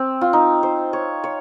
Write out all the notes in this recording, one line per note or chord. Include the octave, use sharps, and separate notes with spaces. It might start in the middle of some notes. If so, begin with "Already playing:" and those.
Already playing: C4
F4
D#4
C5
C#5
C#5